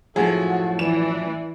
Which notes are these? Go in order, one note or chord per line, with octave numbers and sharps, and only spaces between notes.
F#2 A2 F3 F#4 G#4 A4
E3 D5 E7